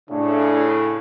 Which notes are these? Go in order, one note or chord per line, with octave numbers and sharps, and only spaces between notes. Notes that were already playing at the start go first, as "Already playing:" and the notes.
A2 C#3 D4